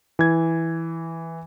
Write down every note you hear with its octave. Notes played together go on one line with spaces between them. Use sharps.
E3 G#6